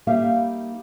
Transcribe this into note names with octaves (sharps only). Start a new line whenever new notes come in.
G3 A#3 D#4 G4 E5 F5